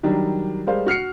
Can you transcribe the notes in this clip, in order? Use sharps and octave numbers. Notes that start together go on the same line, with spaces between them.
D#3 F#3 G3 D4
G3 G#3 A#4 C5 F5
F#4 F6 C7 C#7